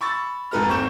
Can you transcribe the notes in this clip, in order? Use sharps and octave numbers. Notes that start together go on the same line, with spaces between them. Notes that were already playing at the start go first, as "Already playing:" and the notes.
B5 C#6 E6 A6
F1 G#2 A4 B4 A#5 F6
G#1 C4 C#6 G6 E7